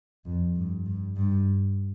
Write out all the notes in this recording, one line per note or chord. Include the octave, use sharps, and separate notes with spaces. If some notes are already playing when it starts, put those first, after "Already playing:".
F2
G2
G2
G2